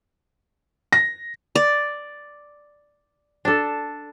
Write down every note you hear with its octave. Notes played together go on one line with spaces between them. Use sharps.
A#6
D5
D4 A4